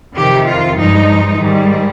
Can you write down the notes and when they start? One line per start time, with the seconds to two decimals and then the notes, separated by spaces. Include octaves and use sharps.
0.16 F2 C3 D#3 G4
0.47 F4
0.78 G2 F3 G#3 D#4
1.38 G#2 D#3 G3